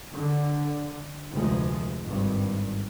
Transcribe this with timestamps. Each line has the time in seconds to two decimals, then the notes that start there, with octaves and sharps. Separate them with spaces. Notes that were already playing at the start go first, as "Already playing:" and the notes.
0.12 D3
1.32 F1 D2 F3 G#3
2.05 G#1 G2